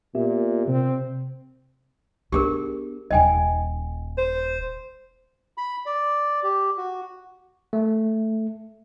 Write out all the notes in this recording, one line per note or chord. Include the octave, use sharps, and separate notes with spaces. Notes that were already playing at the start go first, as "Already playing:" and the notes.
A#2 B3 G4 E5
C3 C4
B3 D4 G4 G#4 A#4
D#1 D#4 D#5 G5 G#5
C5
B5
D5
G4
F#4
A3